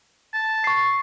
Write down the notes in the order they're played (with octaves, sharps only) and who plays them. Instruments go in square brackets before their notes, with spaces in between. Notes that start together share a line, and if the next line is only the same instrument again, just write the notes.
[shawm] A5
[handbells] C#6 C7